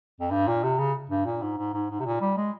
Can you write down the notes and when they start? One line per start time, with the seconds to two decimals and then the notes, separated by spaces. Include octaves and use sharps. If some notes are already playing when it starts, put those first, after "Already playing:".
0.21 F2
0.31 G2
0.48 A#2
0.63 C3
0.78 C#3
1.10 G2
1.26 A#2
1.42 G#2
1.58 G#2
1.73 G#2
1.90 G#2
2.00 C3
2.05 A#2
2.21 G3
2.37 G#3